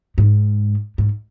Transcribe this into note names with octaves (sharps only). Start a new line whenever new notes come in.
G#2
G#2